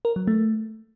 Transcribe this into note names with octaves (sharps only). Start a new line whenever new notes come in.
A#4
F#3
A3